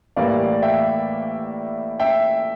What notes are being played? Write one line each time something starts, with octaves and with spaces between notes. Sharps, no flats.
A2 E3 G3 A#3 D5 F5
E5 G5
E5 G5